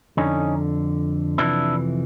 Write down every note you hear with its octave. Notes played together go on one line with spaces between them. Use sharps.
F2 D3 C#4 D#4
F2 C3 E3 D4 E4